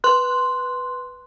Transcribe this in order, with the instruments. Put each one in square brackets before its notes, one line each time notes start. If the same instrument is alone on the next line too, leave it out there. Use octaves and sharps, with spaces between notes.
[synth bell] B4 C6 F#6